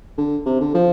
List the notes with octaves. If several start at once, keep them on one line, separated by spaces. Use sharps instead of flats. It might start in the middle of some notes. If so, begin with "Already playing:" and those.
D3
C3
D3
F3